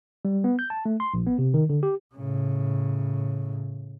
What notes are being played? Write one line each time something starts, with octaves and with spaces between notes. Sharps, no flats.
G3
B3
G6
A5
A3
C6
A#1
B3
C3
D#3
D3
G4
A2 C#3